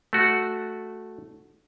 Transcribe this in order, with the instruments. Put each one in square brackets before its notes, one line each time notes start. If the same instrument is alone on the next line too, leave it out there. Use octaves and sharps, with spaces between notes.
[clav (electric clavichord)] A3 F#4